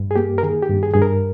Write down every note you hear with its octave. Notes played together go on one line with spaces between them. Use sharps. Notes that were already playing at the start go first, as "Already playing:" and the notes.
Already playing: G2
G#4
A#3 G4
A#4
D#3 G#4
G4
G2
G#4
G2 G#4
A#4